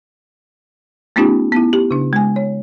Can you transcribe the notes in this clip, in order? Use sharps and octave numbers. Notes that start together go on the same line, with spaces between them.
A3 B3 C#4 D#4 F4 G4
B3 E4
G4
C#3 D4
G#3 G#5
C#5